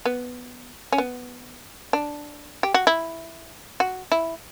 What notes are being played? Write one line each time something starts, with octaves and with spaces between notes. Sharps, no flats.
B3
C#4
B3
D4
G4
F#4
E4
F#4
E4